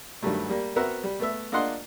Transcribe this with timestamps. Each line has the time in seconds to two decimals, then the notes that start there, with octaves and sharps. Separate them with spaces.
0.22 G2 D3 D#3 F#3 G3 A3
0.49 G3 A#3
0.76 B3 C4 F#4 A#4 E5 F#5
1.03 G3
1.20 A3 B3 E5
1.52 A#3 D4 F4 D#5 F#5 C6